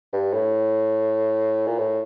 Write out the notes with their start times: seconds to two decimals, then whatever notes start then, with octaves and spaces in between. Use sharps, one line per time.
0.13 G2
0.33 A2
1.67 A#2
1.78 A2